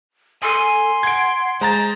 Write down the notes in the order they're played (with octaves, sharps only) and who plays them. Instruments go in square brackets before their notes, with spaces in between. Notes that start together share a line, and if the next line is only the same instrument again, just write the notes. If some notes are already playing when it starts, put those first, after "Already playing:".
[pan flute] A4 [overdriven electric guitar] G#5 [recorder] C6
[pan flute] F#5 [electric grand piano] G#6 D7
[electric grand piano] G#3 A#5 A6 [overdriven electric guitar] C5